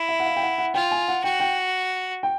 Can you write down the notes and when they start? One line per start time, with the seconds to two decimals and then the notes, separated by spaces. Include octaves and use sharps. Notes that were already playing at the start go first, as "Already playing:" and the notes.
Already playing: E4
0.09 E5
0.20 F#5
0.26 F5
0.36 G5
0.43 F#5
0.58 F#5
0.74 F4 G5
0.91 G#5
1.08 F#5
1.24 F#4 G5
1.40 G5
2.23 G5